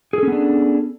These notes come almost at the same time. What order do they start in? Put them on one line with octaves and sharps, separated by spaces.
G#4 A4 C#4 B3 D4